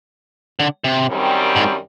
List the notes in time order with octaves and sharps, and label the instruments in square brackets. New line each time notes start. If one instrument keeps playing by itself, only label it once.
[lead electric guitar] D3
C3
[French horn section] F#2 D#3 G3 C4
[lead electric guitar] G#2